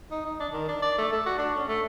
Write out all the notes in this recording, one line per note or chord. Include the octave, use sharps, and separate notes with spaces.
D#4
D#4
D4
D#3
D4
D5
A3
A4
F#4
D4
C#4
A3